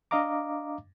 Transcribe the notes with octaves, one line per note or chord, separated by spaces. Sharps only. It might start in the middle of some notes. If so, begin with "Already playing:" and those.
D4 D#5 F5 A#5 D6